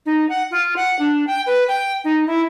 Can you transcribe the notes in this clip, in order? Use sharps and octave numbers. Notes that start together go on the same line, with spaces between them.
D#4
F#5
F4
F#5
D4
G5
B4
G5
D#4
E4